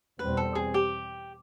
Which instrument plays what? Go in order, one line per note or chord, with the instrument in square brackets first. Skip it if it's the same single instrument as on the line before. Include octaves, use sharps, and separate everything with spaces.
[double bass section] E2 B2 G3 C4 [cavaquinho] B4
[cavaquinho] A4
G#4
G4